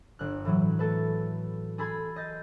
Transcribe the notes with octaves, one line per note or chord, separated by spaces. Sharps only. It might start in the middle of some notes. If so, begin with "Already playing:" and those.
G1 F#6
A2 E3 F#3
A3 A4 B4
G#4 A4 B5 C6 G#6
D#5 G6 A6